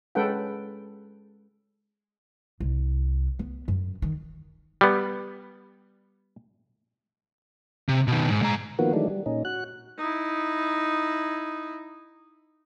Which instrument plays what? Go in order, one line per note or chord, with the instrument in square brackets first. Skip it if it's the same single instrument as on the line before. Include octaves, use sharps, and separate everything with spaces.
[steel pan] G#3 C#4 A4 B4 F#5 G5
[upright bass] C2
B3
F#2
D#3
[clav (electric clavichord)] G3 B3
[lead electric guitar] C3
B2 D#3
G#2
G#3 A#5
[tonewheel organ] D#3 F3 A#3 B3 F#4
D#3 E3 F#3 G#3 A3 D4
G3
A#2 C#4 D#4
F#4 F#6
[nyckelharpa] D#4 E4